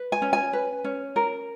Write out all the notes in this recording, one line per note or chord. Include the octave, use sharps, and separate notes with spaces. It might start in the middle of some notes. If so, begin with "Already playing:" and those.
Already playing: B4
G#5
C#4
G#5
B4
C#4
A#4